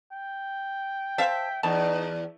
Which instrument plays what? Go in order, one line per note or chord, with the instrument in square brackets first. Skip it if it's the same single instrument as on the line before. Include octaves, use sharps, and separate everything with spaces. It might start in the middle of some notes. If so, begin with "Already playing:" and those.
[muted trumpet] G5
[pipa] C5 F5 A5 [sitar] E5
[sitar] E2 [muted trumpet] D#4 [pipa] A5